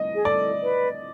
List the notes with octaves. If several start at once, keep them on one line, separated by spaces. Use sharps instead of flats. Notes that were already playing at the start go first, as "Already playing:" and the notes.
Already playing: D#5
G#4
A4 D5
B4